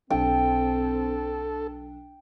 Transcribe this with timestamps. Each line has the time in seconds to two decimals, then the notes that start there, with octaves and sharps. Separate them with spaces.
0.10 B1 C4 D4 A4 G5